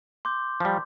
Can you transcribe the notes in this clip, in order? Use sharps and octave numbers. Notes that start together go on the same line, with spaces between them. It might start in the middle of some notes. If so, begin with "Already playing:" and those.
C6 D6 G6
F3 G3